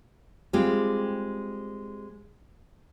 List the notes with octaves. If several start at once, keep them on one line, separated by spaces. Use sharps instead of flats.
G3 G#3 C4 F4 G4